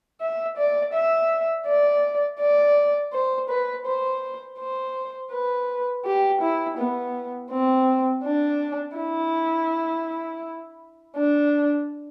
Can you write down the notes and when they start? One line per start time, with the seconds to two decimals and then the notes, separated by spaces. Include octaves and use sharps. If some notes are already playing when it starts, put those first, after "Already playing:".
0.21 E5
0.57 D5
0.94 E5
1.67 D5
2.40 D5
3.13 C5
3.49 B4
3.86 C5
4.59 C5
5.32 B4
6.05 G4
6.41 E4
6.78 B3
7.51 C4
8.24 D4
8.97 E4
11.16 D4